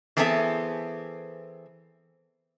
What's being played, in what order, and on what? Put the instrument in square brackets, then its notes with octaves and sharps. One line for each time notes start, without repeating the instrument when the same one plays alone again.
[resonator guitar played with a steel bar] E3 B3 C4 G#4 A4 E5